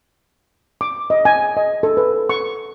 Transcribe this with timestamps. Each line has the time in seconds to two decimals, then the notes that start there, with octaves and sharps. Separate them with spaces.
0.81 D6
1.10 D#5
1.25 G#5
1.57 D#5
1.83 A4
1.97 B4
2.29 C#6